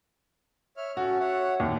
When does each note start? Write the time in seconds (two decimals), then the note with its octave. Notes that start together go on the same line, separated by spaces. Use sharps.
0.77 C#5 E5 F6
0.97 C#4 F#4 A4
1.20 C#5 E5 F#5
1.60 D#2